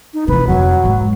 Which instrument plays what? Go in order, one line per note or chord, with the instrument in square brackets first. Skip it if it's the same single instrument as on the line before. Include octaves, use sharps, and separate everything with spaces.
[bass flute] D#4
[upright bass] C3 E3 [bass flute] B4
[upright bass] F2 D3 [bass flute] F#3
[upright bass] G#2 G#3